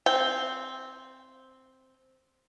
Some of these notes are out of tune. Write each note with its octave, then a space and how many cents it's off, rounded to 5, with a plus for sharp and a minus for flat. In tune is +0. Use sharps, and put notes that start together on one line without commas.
C4 +0 G5 +0